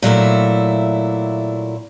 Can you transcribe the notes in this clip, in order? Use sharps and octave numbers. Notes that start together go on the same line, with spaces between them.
A#2 F#3 A3 E4